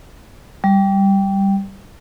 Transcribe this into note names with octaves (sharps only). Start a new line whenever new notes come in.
G3